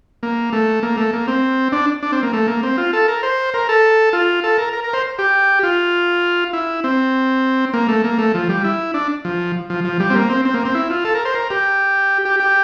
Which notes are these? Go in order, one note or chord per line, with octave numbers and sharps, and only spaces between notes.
A#3
A3
A#3
A3
A#3
C4
D4
D4
C4
A#3
A3
A#3
C4
F4
A4
A#4
C5
A#4
A4
F4
A4
A#4
A#4
A#4
C5
G4
F4
E4
C4
A#3
A3
A#3
A3
F3
G3
E4
D4
F3
F3
F3
G3
C4
A#3
C4
C4
A#3
C4
E4
F4
A4
A#4
C5
A#4
G4
G4
G4